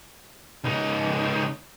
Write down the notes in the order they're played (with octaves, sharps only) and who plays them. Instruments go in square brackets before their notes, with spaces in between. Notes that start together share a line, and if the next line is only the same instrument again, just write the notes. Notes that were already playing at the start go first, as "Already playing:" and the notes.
[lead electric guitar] C#2 D#4